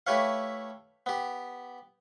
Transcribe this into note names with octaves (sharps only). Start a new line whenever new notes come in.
A3 E4 G4 B4 C#5 F5
B3 G4